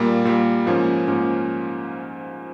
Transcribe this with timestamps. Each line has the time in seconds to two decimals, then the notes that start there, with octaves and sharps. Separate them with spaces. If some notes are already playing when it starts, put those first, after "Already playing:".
Already playing: A#2 G3 A#3
0.25 A#2 G3 A#3
0.66 G#2 F3 A#3 C#4
1.08 G#2 F3 A#3 C#4